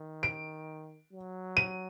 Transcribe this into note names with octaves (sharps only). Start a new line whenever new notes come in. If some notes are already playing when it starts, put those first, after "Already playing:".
Already playing: D#3
D7
F#3
D#7